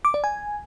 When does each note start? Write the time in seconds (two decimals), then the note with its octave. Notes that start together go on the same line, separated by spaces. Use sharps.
0.05 D6
0.14 D5
0.24 G#5